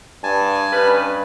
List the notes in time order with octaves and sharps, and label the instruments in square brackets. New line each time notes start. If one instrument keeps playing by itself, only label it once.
[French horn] G2 [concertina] G#5 A5
[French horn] G2 [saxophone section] C#4 D#4 B4